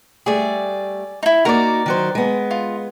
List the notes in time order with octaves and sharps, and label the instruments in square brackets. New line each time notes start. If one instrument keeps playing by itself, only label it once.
[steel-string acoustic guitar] G3 A3 [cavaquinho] G#4 D5
[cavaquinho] D#4 E4
[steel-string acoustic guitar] A#3 D#4 F#4 [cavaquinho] A#4 D5
[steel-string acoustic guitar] D#3 F#3 C5
G#3 B3
[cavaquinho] F4